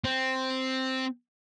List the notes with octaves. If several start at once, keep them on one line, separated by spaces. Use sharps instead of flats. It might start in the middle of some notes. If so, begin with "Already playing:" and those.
C4